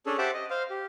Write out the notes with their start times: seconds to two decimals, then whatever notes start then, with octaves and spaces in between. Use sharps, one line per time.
0.06 C#4 D4 G#4 A4
0.18 G4 C5 E5 F#5 A5 D6
0.34 D#5
0.50 C5 F5
0.70 G4